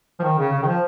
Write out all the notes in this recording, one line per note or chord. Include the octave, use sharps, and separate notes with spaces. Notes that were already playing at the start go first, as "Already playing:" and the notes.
F3
D#3
C#3
C#3
D#3
F3